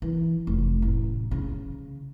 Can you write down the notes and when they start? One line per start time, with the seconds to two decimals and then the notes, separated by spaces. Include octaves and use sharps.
0.02 E3
0.47 F1
0.82 A1
1.31 C#3